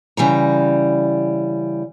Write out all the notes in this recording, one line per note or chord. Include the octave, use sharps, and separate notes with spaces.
C#3 E3 G3 A#5